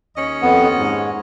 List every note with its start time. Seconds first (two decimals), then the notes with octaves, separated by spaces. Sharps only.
0.15 D#2 C#4 D#5
0.42 F2 B3
0.78 G#2